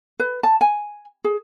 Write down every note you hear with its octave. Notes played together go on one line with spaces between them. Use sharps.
B4
A5
G#5
G#4